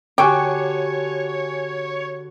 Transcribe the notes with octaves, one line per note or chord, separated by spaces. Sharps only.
D3 F#4 G4 C#5 G5 G#5 C#6 D6